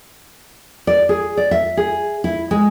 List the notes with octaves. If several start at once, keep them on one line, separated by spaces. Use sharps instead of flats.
D5
G#4
D5
E5
G#4
E4
G#3